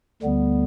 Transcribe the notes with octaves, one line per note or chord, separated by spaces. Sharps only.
D2 D3 G3 B3